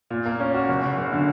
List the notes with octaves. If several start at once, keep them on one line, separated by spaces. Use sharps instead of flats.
A#2
A#3
C#4
F#4
F#1
F#1
F#1
D3